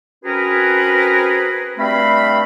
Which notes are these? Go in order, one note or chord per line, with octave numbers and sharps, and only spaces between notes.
C4 C#4 F#4 G#4 A#4 B4
G2 A3 C4 F5 B5